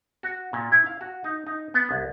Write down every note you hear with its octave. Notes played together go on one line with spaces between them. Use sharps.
F#4
A#2
E4
F5
F#4
D#4
D#4
B3
C2